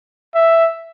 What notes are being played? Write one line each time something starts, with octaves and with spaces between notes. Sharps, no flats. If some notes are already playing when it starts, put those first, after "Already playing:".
E5